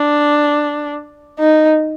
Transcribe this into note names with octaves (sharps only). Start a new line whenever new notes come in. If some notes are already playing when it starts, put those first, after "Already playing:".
Already playing: D4
D#4